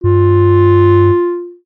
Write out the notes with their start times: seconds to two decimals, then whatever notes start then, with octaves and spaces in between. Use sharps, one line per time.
0.04 G2 F4